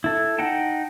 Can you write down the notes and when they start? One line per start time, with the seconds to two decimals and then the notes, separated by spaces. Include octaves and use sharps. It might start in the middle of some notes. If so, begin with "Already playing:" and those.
0.04 E4 A4
0.38 D#4 F#5 G5 A5